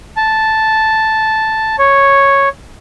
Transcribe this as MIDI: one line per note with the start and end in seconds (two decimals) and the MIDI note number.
0.17 1.76 81
1.79 2.49 73